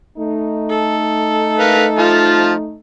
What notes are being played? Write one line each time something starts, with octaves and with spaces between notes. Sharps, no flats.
A3 D#4
A4
A#4 B4 F5
F3 F4 A5